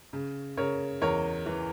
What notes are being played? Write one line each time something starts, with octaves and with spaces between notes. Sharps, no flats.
C#3
C#3 A#4 C#5
E2 A#4 C#5
E3